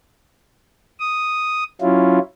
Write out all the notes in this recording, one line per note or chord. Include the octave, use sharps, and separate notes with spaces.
D#6
F#3 C#4 E4 F4